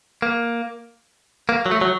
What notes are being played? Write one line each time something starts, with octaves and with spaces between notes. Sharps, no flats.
A#3
A#3
F#3
A3
F#3